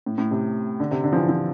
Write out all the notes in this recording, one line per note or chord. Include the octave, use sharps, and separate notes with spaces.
A2
A2
C3
D3
C3
D3
F3
E3
F3